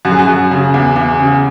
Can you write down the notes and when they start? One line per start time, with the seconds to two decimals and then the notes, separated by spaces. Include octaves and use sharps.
0.05 F#2 F#4
0.12 G#4
0.19 F#4
0.27 F#2
0.51 C#3
0.74 E2
0.96 E2
1.19 C#3